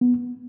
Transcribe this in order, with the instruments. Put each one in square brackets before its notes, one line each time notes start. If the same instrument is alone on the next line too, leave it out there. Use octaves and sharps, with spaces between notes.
[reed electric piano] B3